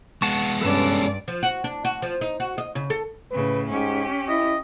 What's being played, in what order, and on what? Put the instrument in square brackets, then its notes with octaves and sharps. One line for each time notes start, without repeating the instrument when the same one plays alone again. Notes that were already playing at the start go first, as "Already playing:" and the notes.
[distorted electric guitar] G#3 B3 [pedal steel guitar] F#5 A5 C#6
[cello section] G2 D5 [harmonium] C#4 [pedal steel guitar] A4 B4 A5
[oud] F3
F#4
D4
F#4
F3
D#4
F#4
D#5
C#3
A4
[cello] A2 C#3 [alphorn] B4
[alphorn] G#2 [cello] C#4 G4
[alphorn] E4 [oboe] D#5